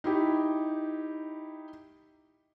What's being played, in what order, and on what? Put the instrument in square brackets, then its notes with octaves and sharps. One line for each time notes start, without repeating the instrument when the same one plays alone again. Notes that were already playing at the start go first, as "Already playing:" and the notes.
[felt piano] D#4 E4 G4